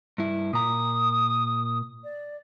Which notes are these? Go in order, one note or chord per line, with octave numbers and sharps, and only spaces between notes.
G2 E4
A#2 A#5 D#6
D5